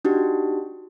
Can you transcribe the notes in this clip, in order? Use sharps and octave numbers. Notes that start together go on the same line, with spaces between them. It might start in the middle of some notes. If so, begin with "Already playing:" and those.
D4 D#4 F#4 G4